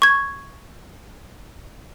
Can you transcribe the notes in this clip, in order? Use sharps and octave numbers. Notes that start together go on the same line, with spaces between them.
C#6 G#6